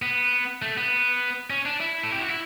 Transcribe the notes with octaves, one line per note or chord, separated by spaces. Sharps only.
B3
A3
B3
C#4
D4
E4
A4
G4
F#4
E4